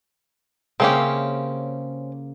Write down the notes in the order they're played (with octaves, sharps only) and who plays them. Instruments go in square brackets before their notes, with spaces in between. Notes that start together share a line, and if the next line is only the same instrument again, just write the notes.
[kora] C#3 A#3 E5 [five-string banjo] C4 C#4 G4